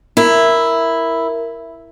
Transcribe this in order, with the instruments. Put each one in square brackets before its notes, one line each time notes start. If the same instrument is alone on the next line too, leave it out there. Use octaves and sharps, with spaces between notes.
[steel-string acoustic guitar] E4 [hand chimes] A#4